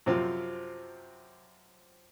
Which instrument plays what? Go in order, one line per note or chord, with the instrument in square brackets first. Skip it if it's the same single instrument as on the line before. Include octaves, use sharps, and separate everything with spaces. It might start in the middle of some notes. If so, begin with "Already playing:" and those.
[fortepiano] F#2 C3 F3 C4 F4